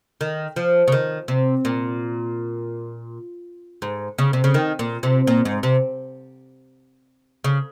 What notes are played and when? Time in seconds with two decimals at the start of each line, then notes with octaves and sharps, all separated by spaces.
0.21 D#3
0.56 F3
0.88 C#3
0.92 D#3
1.28 C3
1.65 A#2
3.82 G#2
4.18 C#3
4.33 C3
4.44 C#3
4.54 D#3
4.79 A#2
5.03 C3
5.27 A#2
5.45 G#2
5.63 C3
7.44 C#3